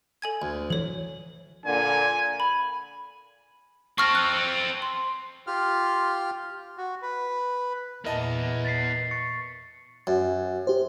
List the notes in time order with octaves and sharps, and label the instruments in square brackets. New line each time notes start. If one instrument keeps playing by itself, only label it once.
[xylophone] A4 G#5 G#6
[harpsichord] D2
[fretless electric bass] E3 F3 [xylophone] A4 C#5
[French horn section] A#2 D3 [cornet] G#5
[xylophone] B5
[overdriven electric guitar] C4 A4 [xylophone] C#6 F6 A#6
[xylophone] F#6
C6
[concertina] F4 G4 F6
F#4
B4
[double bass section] E2 A#2 [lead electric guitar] B3 E4 [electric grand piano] A#4 D#5 A5
[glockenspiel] A6 B6 C7
C#6 A6 C#7
[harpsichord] F#2
[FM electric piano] G4 C5